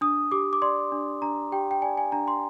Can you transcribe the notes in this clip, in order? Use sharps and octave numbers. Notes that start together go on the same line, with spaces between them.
D4 D#6
G4 D6
D6
D5 C6
D4
D4 A#5
G4 G5
G5
D5 G#5
G#5
D4 A#5
C6